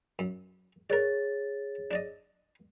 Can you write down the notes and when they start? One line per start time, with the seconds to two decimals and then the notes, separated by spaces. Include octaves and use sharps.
0.19 F#2
0.90 G#4 A#4 C#5 D5 A6
1.91 D4 D5 D#5